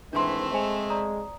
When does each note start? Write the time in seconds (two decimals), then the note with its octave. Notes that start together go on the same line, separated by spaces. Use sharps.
0.13 G#2 D#3 E3 A3 C4 D4 C6
0.52 G#3 C5 G#5 F7
0.90 D5 A#5 D#6